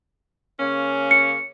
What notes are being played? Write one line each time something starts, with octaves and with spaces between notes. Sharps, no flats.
C#3 A#3 C#4
C#7